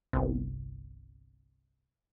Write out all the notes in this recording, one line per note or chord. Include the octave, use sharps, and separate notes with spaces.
G1 C2